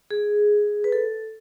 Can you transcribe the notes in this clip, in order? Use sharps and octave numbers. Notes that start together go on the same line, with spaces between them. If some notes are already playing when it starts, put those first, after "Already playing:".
G#4
B4
A4